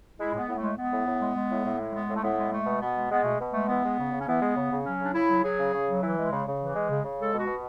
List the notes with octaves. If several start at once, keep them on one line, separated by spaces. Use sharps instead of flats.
G#3 E4
A2 B3
A2
A3
G#3
G#3 B3
A2
A2
G#3
G#3
A2
A2
G#3
G#3 B3
A2
A3
A2 B3
G#3
G#3 A3
B2
B2 B3
G#3
G#3 B3
B2 A3
B2
G#3 A3
E3 B3
G#3
C#3
C#3
C#4
E3 B3
G#3
C#3
C#3
F#3 C#4
C#3 D4
C#3 E4
F#3
F#3 G#4
C#3
C#3
F#3
E3
G#3
C#3
C#3
E3
G#3
C#3
C#3
G#3 A4
B2
F#4
B2